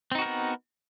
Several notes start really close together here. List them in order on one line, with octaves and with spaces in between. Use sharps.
C4 D#4 F#4 A#4 B3